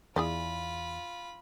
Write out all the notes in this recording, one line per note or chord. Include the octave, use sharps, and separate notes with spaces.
E2 E4 F4 G#4 D5 B5